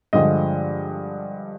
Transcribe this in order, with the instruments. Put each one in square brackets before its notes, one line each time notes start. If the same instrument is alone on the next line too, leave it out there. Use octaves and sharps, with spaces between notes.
[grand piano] G2 D3 F3 G#3 D#5